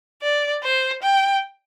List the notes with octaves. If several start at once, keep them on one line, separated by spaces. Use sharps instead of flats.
D5
C5
G5